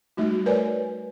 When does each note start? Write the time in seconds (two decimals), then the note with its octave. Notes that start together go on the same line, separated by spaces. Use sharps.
0.17 G3 A3 D#4 F#4
0.46 A#4 B4 C#5 D5 G#5